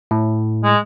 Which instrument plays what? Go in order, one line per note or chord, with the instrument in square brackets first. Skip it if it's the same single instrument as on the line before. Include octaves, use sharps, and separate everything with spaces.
[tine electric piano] A2
[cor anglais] G#3